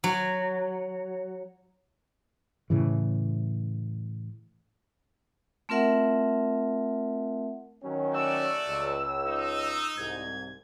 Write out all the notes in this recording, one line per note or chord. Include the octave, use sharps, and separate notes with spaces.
F#3
A2 C#3 E3
A3 C4 F4 A#4 E5 F#5
D#3 F#3 C#4
A3 F#4 D5 E6
C#2
D#4
C2 G#2 G#6